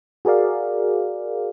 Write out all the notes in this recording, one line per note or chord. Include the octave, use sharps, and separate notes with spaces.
F#4 G#4 A#4 D5 F5